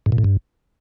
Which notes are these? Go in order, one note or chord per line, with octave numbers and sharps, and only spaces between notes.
G#2
A#2
A2
G2